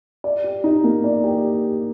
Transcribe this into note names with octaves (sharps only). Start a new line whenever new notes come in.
D5
G4
D#4
A#3
D5
G4